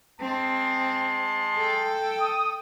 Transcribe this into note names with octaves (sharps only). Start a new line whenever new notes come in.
G#3 C4 A5 C6
A4 G5
D#6